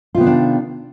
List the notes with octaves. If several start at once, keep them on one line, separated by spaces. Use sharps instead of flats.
C3 D#3 B3 D4 F4